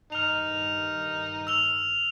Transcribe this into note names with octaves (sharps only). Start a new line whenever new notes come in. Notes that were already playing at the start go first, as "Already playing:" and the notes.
G2 D#3 D#4 F6 F7
E6 F7 G7